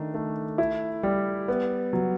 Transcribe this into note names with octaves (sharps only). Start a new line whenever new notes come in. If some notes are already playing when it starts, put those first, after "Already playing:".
Already playing: D#3 A3 D4
A3
E4
G3
B3
F#3